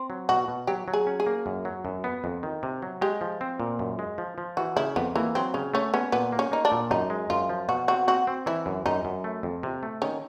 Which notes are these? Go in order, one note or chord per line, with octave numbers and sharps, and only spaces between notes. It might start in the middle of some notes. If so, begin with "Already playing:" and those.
Already playing: C4
F#3
B2 F#4
B2
F#3 G4
F#3
G#4
C#4
G#4
A#3
F#2
F#3
F#2
B3
F2
D#3
C3
F#3
G#3 G4
F3
C4
A#2
F#2
G#3
F3
F3
E3 F#4
C#3 E4
F2 B3
E3 A#3
F#3 C4
C#3 C#4
A3 C#4
B3 C#4
A#2 B3
A#3
C#4
A#3 D#4
D4
A#2
F#2 D#4
G#3
F#2 F4
F3
B2 F#4
C4 F#4
C4 F#4
C4
E3 E4
F#2
F#2 D#4
F#2
A3
F2
C3
A3
D#3 C#4